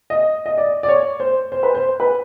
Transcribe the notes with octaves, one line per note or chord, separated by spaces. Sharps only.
D#5
D#5
D5
D5
C#5
C5
C5
B4
C5
B4